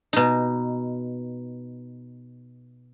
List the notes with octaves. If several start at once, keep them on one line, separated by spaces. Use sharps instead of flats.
B2 D#4